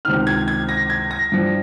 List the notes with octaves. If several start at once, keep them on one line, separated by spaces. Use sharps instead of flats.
C#2 C3 D#3 F6
G#6
G#6
A#6
G#6
A#6
G2 F3